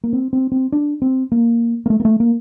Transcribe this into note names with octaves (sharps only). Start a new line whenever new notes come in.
A#3
C4
C4
C4
D4
C4
A#3
A#3
A3
A#3
A3
A#3